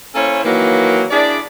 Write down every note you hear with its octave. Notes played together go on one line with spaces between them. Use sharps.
A#3 C#4 E4 A4 C5 C#5
D#3 E3 F#3 A#3
D4 E4 G#4 D5